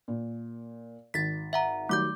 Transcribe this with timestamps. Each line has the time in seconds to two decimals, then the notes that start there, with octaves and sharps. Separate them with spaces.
0.08 A#2
1.14 G#1 A6 B6
1.53 E5 F#5 A#5
1.89 D#3 F#3 G3 A3 D6 G6